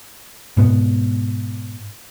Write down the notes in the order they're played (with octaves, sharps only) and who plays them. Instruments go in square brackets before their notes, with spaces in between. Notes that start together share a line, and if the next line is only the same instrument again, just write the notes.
[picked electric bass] G#2 B2 B3